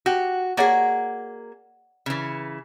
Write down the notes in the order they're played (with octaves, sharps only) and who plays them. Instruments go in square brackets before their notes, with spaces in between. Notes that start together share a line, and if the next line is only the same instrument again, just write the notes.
[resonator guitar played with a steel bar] F#4 [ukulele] G4
[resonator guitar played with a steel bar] A#3 G#4 [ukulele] C#5 D5 F#5
[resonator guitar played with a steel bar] C#3 E3